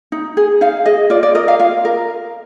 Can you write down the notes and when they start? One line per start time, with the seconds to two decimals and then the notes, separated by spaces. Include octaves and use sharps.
0.12 D#4
0.37 G#4
0.61 D#4 F5
0.86 G#4 D#5
1.10 F4 D5
1.23 D5
1.35 A#4 D#5
1.48 F5
1.60 F4 F5
1.85 A#4